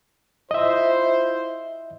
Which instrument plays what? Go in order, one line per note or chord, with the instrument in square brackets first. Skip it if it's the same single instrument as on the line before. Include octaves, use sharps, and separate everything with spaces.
[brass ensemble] E4 F4 C5 [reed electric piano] D#5 E5